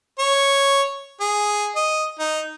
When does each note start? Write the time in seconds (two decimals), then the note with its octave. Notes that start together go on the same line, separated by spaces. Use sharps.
0.19 C#5
1.20 G#4
1.76 D#5
2.19 D#4